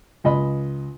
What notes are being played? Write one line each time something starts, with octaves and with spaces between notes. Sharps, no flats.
C#2 D#5 B5